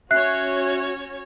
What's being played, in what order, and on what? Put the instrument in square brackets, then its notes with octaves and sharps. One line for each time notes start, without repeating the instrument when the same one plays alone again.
[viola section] C#4 F#4 C#5 [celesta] E5 F#6 C7